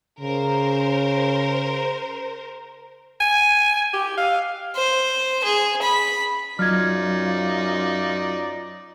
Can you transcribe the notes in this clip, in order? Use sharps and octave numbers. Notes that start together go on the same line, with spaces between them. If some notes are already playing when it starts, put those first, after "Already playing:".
C#3 A#4 C5
G#5
G4
F5
C5
G#4
B5
F#2 F#3 D#4 F4 D5 F6 G#6